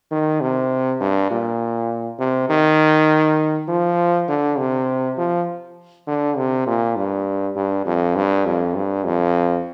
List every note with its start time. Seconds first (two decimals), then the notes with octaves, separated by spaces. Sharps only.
0.11 D#3
0.41 C3
1.00 G2
1.31 A#2
2.19 C3
2.49 D#3
3.68 F3
4.28 D3
4.58 C3
5.18 F3
6.07 D3
6.37 C3
6.67 A#2
6.96 G2
7.56 G2
7.86 F2
8.16 G2
8.46 F2
8.75 G2
9.05 F2